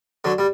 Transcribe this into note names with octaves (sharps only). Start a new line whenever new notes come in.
D3 F#3
G3